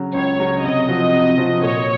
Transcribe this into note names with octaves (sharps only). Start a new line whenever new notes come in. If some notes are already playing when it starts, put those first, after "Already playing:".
Already playing: C#3 F#3
C#2 C#5
C#3 F#3
C3 D#5
F3 C4 F#4
C3
F3 C4 F#4
A#2 C#5